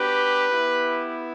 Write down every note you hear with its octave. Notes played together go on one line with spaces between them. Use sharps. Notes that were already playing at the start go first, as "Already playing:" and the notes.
Already playing: B3 D4 F#4 G4 B4
B3 E4 G4